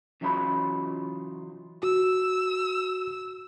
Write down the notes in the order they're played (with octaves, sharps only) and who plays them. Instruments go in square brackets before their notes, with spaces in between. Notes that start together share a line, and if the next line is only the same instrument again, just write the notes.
[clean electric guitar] C#3 E3 F#3 D#4 F4 B5
[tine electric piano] F#4 [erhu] E6